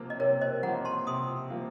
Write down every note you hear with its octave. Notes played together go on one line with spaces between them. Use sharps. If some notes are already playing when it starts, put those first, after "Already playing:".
Already playing: C3 F3 A#3 F4
D#5
C3 A#4 C#5
C5 D#5
F3 A#3 F4 F#5 A#5
A5 C6
C3 C6 D#6
F3 A#3 F4